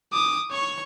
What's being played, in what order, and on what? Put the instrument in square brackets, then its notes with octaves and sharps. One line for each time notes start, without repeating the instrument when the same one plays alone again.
[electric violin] D6 D#6
C#5 C#6